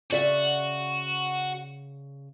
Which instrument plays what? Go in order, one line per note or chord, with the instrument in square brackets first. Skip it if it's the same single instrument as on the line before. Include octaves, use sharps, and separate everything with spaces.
[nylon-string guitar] C#3 D5 E5 [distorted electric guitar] F#4